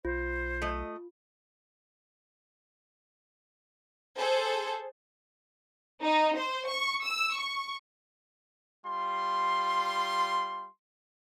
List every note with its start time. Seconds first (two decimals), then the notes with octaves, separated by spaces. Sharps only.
0.05 B1 F4 C5
0.62 A3 D#5
4.18 G#4 A4 C5
6.01 D#4
6.36 C5
6.69 C#6
7.04 E6
7.36 C#6
8.86 G3 F4 C6